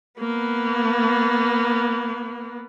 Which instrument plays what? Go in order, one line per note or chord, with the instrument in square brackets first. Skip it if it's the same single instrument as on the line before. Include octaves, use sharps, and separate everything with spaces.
[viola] A#3 B3